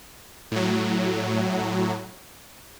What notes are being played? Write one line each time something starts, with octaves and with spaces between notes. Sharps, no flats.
A2 F#3